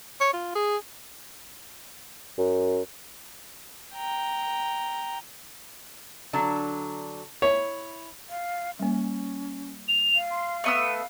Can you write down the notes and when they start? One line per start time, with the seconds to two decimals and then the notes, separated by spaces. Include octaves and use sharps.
0.21 C#5
0.33 F4
0.55 G#4
2.38 F#2
3.94 G5 A#5
6.33 D3 F#3 D4
7.42 E4 C#5
8.30 F5
8.79 G3 A#3 C#4
9.88 F7
10.16 F5
10.30 C6
10.64 A3 B3 E6 D#7